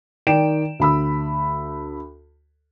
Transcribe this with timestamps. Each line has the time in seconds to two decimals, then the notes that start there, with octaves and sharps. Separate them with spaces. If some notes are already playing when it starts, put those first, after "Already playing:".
0.27 D#3 D5 G5 D7 E7
0.79 D2 B5 E6